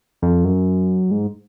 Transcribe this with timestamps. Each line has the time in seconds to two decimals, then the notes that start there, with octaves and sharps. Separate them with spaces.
0.22 F2
0.45 F#2
1.11 G#2